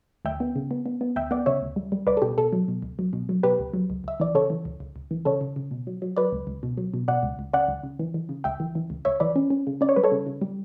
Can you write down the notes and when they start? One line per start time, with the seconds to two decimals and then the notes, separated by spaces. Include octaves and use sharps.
0.25 D2 E5 G5
0.40 B3
0.56 C#3
0.71 B3
0.86 B3
1.01 B3
1.16 D2 E5 G5
1.31 B3 D5 F#5
1.46 C#3 C#5 E5
1.62 D2
1.76 G3
1.92 G3
2.07 C#2 B4 D5
2.17 A4
2.22 B2 G4
2.38 B2 A4
2.53 F#3
2.68 B2
2.82 C#2
2.99 F#3
3.13 B2
3.29 F#3
3.43 B2 G4 B4
3.59 C#2
3.74 F#3
3.90 C#2
4.04 C#2 E5
4.20 E3 D5
4.34 C#3 A4 C#5
4.50 E3
4.65 C#2
4.80 C#2
4.96 C#2
5.11 E3
5.25 C#3 A4 C#5
5.41 C#3
5.56 C#3
5.71 B2
5.87 F#3
6.02 F#3
6.16 F#3 B4 D5
6.32 C#2
6.47 C#2
6.63 B2
6.77 F#3
6.94 B2
7.08 B2 D5 F#5
7.23 C#2
7.39 C#2
7.53 C#3 D5 F#5
7.68 C#2
7.83 C#3
7.99 E3
8.14 E3
8.29 C#3
8.44 C#2 E5 G5
8.60 E3
8.75 E3
8.90 C#2
9.05 C#2 C#5 E5
9.20 E3 B4 D5
9.36 C#4
9.50 C#4
9.67 C#3
9.81 C#4 D5
9.89 C#5
9.96 G3 B4
10.04 A4 C#5
10.11 C#3
10.26 C#3
10.42 G3